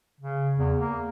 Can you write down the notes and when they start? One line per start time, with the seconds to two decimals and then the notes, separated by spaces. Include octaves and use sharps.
0.20 C#3
0.58 E2
0.79 A#3